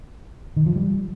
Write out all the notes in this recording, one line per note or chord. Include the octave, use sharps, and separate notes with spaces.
D#3
F3
G3